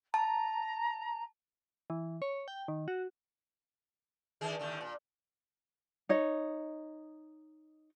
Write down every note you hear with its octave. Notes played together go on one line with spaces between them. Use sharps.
A5 A#5
E3
C#5
G5
D#3
F#4
D3 D#3 G#4
D#2 A2 D3
A#2
D#4 C#5 D#5